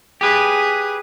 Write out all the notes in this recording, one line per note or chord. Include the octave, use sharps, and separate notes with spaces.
G4 G#4 B4